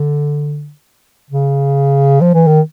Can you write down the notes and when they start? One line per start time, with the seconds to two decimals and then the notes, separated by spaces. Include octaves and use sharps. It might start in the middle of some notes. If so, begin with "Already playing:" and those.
Already playing: D3
1.31 C#3
2.21 F3
2.34 E3
2.47 D#3